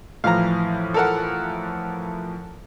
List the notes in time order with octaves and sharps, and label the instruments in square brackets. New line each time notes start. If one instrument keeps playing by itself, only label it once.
[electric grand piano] A2 E3 F3 [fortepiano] F5 A#5
[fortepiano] A4 A#4 F#5